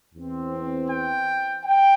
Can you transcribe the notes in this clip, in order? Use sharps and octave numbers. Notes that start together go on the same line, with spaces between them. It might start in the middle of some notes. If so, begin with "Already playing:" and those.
E2 E3 C4
G5
G5